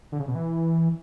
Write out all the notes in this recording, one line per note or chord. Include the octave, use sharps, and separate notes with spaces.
D3
C#3
B2
E3